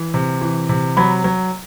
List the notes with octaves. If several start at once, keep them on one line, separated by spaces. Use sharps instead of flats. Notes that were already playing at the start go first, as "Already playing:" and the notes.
Already playing: E3
C3
E3
C3
F#3 B5
F#3